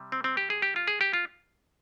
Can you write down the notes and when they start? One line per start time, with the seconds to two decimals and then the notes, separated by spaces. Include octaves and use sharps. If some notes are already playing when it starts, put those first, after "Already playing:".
Already playing: C3 G3
0.12 C4
0.24 C4
0.37 G4
0.50 G#4
0.62 G4
0.76 F4
0.88 G#4
1.01 G4
1.13 F4